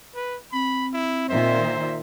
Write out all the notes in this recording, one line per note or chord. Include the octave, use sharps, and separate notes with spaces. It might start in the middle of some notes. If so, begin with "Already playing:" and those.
B4
C4 B5
E4
A#2 D#3 C5 E5